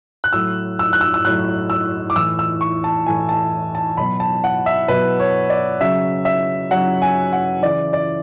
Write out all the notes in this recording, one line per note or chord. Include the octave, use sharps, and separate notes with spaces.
F#6
A2 F#3 E6
E6
F#6
E6
E6
A2 F#3 F#6
E6
D6
A2 E3 E6
E6
C#6
A5
A2 E3 G#5
A5
A5
B2 F#3 B5
A5
F#5
E5
B2 F#3 B4
C#5
D5
C#3 F#3 E5
E5
C#3 F#3 F#5
G#5
F#5
C#3 E3 D5
D5